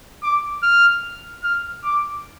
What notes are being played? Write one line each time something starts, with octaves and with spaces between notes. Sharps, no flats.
D6
F6
F6
D6